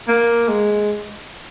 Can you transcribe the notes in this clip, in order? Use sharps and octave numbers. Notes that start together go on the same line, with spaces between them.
A#3
G#3